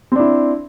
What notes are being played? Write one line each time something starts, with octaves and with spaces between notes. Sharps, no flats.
C4 D4 E4